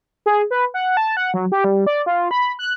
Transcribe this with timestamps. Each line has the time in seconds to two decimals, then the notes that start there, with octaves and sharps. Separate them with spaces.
0.26 G#4
0.51 B4
0.74 F#5
0.97 A5
1.17 F#5
1.34 F#3
1.52 G4
1.64 G3
1.87 D5
2.06 F4
2.31 B5
2.59 F#6